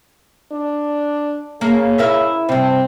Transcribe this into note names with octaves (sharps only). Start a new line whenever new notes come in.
D4
C#3 A#3
E4 A#4 E5
G2 C3 C4